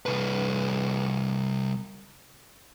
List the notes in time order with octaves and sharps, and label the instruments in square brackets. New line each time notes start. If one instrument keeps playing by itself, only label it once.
[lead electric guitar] C2 B4